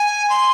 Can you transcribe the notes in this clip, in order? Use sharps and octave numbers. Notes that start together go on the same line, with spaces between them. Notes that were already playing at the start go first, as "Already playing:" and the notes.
Already playing: G#5
C6